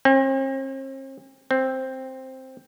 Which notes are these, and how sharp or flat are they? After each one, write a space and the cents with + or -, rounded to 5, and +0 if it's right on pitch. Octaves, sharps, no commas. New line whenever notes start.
C4 +45
C4 +5